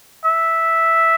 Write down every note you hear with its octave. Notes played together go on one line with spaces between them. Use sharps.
E5